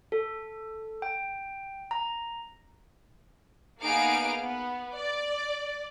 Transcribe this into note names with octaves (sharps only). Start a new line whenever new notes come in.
A4
G5
A#5
A#3 B3 D#4 G#4 F5 D7
B3
D5